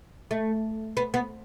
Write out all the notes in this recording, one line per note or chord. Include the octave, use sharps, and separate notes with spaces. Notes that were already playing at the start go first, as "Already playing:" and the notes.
A3
B3
B3